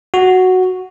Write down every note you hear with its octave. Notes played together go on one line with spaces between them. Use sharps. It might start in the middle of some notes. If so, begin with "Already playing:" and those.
F#4